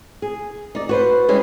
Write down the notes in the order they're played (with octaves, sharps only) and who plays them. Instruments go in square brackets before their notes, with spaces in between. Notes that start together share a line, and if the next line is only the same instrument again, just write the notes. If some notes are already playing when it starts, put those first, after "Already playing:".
[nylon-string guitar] G#4
D#4 D5
F#4 B4 C5
G3 G#3 C#4 E4